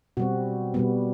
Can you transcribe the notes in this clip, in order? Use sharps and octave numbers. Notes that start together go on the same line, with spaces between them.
B2 G3 C4 F#4
B2 G3 B3